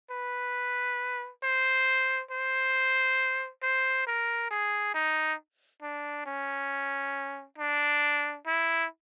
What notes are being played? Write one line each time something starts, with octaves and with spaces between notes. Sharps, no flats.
B4
C5
C5
C5
A#4
G#4
D#4
D4
C#4
D4
E4